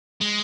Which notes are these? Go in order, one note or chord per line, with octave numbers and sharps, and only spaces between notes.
G#3